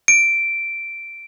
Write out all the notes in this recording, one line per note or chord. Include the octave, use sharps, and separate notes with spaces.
D7